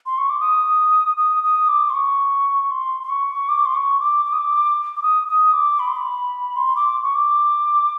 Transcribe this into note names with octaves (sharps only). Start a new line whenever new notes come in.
C6
C#6
D6
D#6
D#6
D#6
D6
C6
C#6
C6
C6
C#6
D6
C6
C#6
D6
D6
D#6
D6
D6
D#6
D#6
D6
B5
C6
B5
C6
D6
C#6
D6